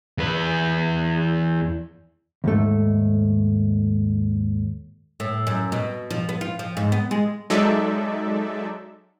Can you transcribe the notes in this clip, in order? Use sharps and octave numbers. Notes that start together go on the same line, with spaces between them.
E2 B4
D#2 G#2 A3
A2
F#2
B2
F3
B3
F4
F3
G#2
B3
G#3
F#3 G#3 D#4 A4 D5 E5